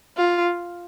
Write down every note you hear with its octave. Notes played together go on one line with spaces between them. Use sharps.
F4